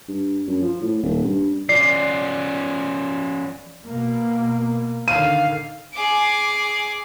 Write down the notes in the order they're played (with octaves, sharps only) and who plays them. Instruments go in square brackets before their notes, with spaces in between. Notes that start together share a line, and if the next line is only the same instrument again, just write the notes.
[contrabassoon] G2
F#2
F3
A2
D#1
G2
[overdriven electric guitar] F3 C#4 [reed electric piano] D5 [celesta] C7
[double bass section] B2 A#3
[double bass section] D3 D#3 [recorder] F5 [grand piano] D#7
[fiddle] G#4 D6